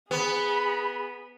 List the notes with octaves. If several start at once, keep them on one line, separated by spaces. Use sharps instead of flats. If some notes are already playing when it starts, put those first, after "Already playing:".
B3 G#4 B5